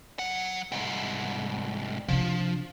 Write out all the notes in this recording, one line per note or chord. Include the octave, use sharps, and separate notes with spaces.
F#3 F#5
C2 G#2
C3 F3 D4